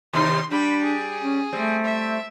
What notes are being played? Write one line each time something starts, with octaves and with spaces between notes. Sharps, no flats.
D#2 C3 D#4 C6
G3 D4 G4 B5
G#4
C#4
G3 A3 C4
E5